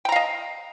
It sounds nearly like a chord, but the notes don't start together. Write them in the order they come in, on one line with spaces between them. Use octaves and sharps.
G5 A#5 F5 D#5